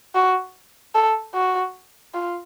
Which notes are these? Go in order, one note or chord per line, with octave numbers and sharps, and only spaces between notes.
F#4
A4
F#4
F4